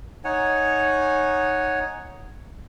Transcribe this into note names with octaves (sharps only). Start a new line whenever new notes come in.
D#4 C#5 F#5 G#5